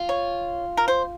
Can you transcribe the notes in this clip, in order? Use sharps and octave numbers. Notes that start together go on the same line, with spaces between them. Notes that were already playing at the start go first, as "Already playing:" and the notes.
Already playing: F4
C#5
A#4
C5